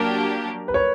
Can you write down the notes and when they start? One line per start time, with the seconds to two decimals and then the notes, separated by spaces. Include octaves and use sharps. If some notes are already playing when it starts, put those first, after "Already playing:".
Already playing: F#3 A#3 D4 G4 A#4
0.68 B4
0.74 C#5